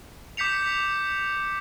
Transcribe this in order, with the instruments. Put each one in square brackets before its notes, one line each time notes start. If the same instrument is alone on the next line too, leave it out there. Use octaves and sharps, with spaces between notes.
[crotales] D6 G6 B6 C#7 F7